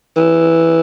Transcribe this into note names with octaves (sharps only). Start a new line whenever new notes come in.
E3